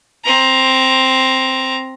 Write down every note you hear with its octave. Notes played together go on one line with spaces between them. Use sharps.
C4 A#5